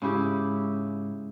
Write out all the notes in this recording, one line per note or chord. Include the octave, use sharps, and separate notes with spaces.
G#2 C#3 E4 G4